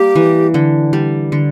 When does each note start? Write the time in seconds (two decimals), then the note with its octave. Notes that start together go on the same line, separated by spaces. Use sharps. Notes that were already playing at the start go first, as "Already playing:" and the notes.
Already playing: G3 A#3 G4
0.15 E3
0.54 D3
0.93 G3
1.32 D3